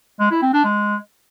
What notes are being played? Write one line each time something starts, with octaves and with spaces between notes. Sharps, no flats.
G#3
E4
C4
D4
G#3